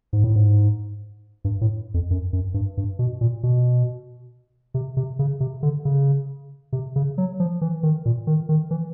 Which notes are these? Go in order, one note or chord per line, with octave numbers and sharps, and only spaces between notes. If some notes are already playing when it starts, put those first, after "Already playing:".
G#2
A2
G#2
G2
A2
F2
F#2
F#2
G2
G2
B2
A#2
B2
C3
C3
C#3
C3
D3
C#3
C3
C#3
F#3
F3
E3
D#3
A#2
D#3
D#3
E3